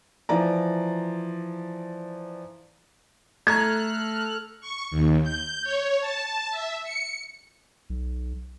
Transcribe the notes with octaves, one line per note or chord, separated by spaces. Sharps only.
E3 F3 D5 A#5
A3 A4 A#5 F6 F#6 G#6
C#6
D#2
G6
C#5
A5
E5
C#7
B1